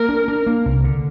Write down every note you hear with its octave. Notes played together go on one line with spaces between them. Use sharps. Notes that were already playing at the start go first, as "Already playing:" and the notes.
Already playing: A#3 A#4
D4
D4
A#3
C2
D3